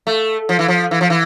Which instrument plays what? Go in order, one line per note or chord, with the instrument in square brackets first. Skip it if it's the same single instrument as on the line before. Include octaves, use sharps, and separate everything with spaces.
[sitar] A3
F3
E3
F3
E3
F3
E3